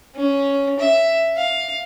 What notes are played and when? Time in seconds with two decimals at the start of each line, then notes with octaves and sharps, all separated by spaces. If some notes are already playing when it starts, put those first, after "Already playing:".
0.16 C#4
0.79 E5
1.36 F5